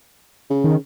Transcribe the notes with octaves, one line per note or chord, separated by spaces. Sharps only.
C#3
D#3